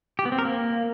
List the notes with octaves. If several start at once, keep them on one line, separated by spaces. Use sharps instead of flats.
G4
B3
C4
A#4
A#3